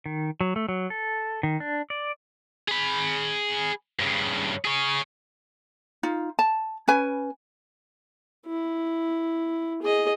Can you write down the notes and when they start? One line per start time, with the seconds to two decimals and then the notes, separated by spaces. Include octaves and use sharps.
0.06 D#3
0.41 F#3
0.56 A3
0.69 F#3
0.90 A4
1.43 D#3
1.60 D4
1.90 D5
2.69 G#4 B5
3.99 G2 C#3
4.65 G#4 C#5
6.03 D#4 F4
6.39 A5
6.88 C#4 B4 G#5
8.46 E4
9.82 G#4 D#5